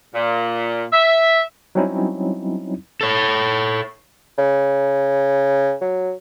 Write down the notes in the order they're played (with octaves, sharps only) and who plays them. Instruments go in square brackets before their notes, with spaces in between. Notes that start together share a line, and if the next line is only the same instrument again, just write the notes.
[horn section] A#2
E5
[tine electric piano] F#3 G3 C4 C#4 D#4 E4
[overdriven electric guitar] A4 C#5
[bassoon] C#3
F#3